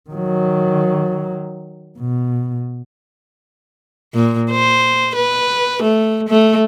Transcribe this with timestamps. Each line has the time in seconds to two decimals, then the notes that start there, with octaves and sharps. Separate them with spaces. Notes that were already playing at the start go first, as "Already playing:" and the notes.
0.10 D#3 F#3
2.00 B2
4.15 A#2
4.51 C5
5.16 B4
5.83 A3
6.29 A3